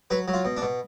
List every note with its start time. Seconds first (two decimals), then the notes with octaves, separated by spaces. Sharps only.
0.10 F#3 B4
0.28 F#3
0.34 F4
0.45 B2
0.57 D4
0.62 B2